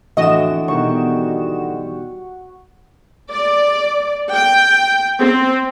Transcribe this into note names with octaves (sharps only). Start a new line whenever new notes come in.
F2 A2 D3 E3 D4 F#4 D#5 E7
B2 D#3 G3 C#6
D5
G5
C4